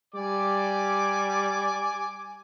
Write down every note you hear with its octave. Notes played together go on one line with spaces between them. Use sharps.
G3 D5 G#5 D6